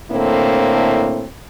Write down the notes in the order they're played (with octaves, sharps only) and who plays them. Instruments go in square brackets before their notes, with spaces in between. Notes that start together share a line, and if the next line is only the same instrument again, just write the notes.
[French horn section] A2 D3 A#3 C4 E4